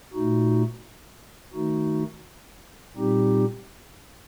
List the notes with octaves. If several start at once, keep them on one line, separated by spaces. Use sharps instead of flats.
A#2 A3 D#4 F#4
D#3 A3 D#4 F#4
A#2 G3 C4 D#4 G4